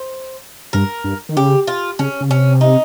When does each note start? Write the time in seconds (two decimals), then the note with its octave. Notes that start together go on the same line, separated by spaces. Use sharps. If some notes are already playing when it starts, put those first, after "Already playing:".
Already playing: C5
0.73 G2 A#4
1.04 G2
1.29 D#3
1.37 C#3 G4
1.67 F4
1.99 C#3 C#4
2.21 C#3
2.30 C3 C#4
2.61 D#4